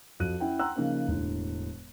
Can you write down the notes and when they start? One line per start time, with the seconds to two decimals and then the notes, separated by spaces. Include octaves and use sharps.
0.20 F2 F3 F#4 F#6 D#7
0.40 C#4 E4 F#5 G5
0.59 F#5 G5 A#5 C6 E6 F#6
0.76 C#3 F3 A#3 C#4 D#4
1.07 E1 A2 D3